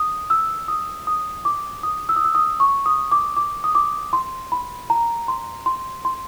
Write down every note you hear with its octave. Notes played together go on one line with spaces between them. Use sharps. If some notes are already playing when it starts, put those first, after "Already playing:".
Already playing: D#6
E6
D#6
D#6
D6
D#6
E6
D#6
E6
D#6
C#6
D#6
D6
D6
D#6
D6
C6
B5
A#5
C6
C6
C6